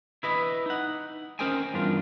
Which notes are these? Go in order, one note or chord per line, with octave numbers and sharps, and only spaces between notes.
E4 B4 D#5
D#4 F#5
C#4 A#4 C5 D#5 G5 G#5
E2 G2 D4 F4 A#4